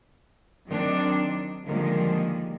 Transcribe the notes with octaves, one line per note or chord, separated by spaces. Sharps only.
D#3 F#3 C4 D4 D#4
D3 D#3 F3 G3 G#3 A#3